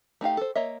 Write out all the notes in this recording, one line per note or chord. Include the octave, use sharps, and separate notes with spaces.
A3 D#4 G4 F5
A4 C5
A#3 C#5 D#5 E5